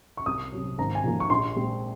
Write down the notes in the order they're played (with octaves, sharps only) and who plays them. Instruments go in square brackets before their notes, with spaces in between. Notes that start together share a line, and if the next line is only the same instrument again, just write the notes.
[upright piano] C#6
C2 D#6
C3 F#3
G#1 A#5
G#5
G#2 F3 A#3
C#6
A#1 C6
A#2 G#3 C4